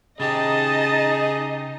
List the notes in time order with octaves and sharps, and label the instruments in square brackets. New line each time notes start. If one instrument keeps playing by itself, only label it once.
[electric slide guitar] C#3 G4 [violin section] D#4 D#5 [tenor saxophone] G#4 [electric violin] A5